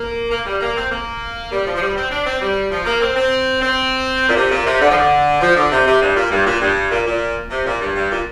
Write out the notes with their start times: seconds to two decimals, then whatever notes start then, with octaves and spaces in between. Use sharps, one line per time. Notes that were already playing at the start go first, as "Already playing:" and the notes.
Already playing: A#3
0.30 A#3
0.46 G3
0.61 A#3
0.76 C4
0.91 A#3
1.51 G3
1.65 F3
1.76 F3
1.81 G3
1.96 C4
2.11 D4
2.26 C4
2.41 G3
2.70 F3
2.85 A#3
3.00 C4
3.15 C4
3.61 C4
4.28 A#2
4.36 C3
4.51 A#2
4.65 C3
4.80 D3
4.90 F3
4.96 D3
5.41 F3
5.55 D3
5.71 C3
5.86 C3
6.01 G2
6.16 A#2
6.30 G2
6.45 A#2
6.61 G2
6.90 A#2
7.06 A#2
7.51 C3
7.66 A#2
7.81 G2
7.95 G2
8.11 A#2